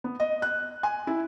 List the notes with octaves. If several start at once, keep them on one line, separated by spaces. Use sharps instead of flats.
B3
D#5
F#6
G#5
E4